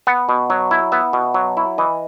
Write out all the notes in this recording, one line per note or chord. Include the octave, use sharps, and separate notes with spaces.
B3 F#5
B2
F#3
E4
B3 E5
B2
F#3
E4
E3 D#5